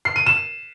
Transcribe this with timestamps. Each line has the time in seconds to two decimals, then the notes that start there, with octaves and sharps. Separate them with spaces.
0.05 C7
0.16 D#7
0.26 E7